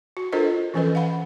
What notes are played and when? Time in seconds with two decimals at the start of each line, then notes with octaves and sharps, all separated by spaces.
0.17 F#4
0.32 D4 F4 A4 A#4 C5 D#5
0.74 E3 F3 C#4 A4 B4 D#5
0.95 F5 F#5 B5